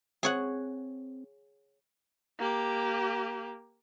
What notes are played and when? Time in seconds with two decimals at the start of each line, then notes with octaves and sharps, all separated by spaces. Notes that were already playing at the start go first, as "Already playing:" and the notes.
0.23 C4 G#4 C#5 F#5
2.39 A#3 G4